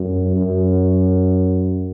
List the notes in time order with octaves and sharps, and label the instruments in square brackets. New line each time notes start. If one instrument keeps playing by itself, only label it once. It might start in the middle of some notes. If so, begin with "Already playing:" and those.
Already playing: [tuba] F#2
F#2